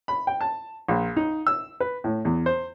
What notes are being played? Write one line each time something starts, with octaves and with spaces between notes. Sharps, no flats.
B5
G5
A5
A#1
D#4
E6
B4
A2
E2
C5